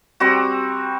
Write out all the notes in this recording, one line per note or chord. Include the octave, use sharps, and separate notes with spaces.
G3 C4 F#4